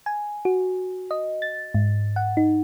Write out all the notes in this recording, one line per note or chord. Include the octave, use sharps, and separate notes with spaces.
G#5
F#4
D#5
A6
G#2
F#5
D#4